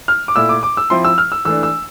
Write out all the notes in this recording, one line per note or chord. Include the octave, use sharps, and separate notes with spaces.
F6
D6
A#2 A3 E4 E6
D6
D6
E6
F3 C4 E4 C6
E6
F6
E6
E3 A3 D4 E6
E6